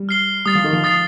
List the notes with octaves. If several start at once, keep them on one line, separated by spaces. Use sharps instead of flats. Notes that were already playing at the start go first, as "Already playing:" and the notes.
Already playing: G3
F6 C7 G7
G3 D#6 A6 C7
F3
D#3
F3
D#6 A6 C7